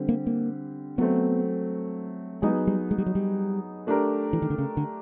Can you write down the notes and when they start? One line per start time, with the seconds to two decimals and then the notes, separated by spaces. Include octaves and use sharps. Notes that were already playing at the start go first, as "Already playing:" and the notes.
Already playing: D3 G3 C4
0.09 A#3
0.27 A#3
0.98 F#3 A3 B3 C4
2.42 F#3 G#3 B3 D#4 G#4
2.67 G3
2.91 G#3
2.98 G3
3.06 F#3
3.15 G3
3.87 A3 D4 G4 A#4
4.33 E3
4.42 D#3
4.50 D3
4.58 C#3
4.77 D3